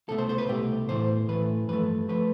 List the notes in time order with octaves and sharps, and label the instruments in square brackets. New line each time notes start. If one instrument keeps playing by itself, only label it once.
[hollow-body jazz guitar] C2 B2 A3 A4
C5
C5
B4
C2 B2 A3 G4
A2 E3 A3 C5
A2 E3 A3 B4
G2 F3 A3 B4
F3 A3 B4